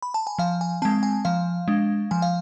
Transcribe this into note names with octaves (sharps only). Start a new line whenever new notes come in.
B5
A5
G#5
F3 F5
G#5
G#3 C4 A5
G#5
F3 F5
G#3 D4
F3 G#5
F5